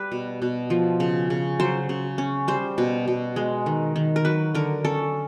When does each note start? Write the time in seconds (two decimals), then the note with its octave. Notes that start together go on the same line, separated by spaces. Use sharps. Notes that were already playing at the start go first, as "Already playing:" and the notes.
Already playing: G3 B4
0.12 B2
0.42 B2
0.70 F3
1.00 C#3
1.30 C#3
1.60 F#3 C5
1.89 C#3
2.18 C#4
2.48 G3 C5
2.78 B2
3.08 B2
3.36 G#3
3.66 D#3
3.96 D#3
4.16 A#4
4.25 F#3 B4
4.55 D3 A#4
4.85 C#4 A4